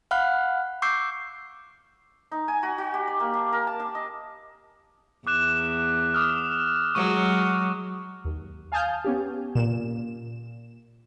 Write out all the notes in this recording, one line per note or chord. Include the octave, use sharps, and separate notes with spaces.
F5 F#5 B5 F6 F#6
C#6 D6 E6 G6 C7
D#4
G#5
F#4
F#4
G4
D5
A#3
D4
A#4
A5
D4
D#5
E2 D6 F#6 E7
D6 D#6 F6
F#3 G#3 C#6
D#2
F5 G#5 A5 D#6 F6 G6
B3 C#4 G4
A#2 E7